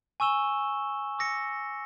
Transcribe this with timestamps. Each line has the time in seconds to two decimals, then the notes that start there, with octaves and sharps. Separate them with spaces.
0.20 G#5 C#6 E6 E7 G7
1.19 D6 E6 A#6 C#7